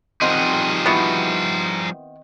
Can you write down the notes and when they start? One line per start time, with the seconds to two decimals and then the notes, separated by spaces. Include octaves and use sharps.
0.22 D#3 F3 G3 C4 D#4 G#4 A#4 F#5
0.86 B3 E4 F#4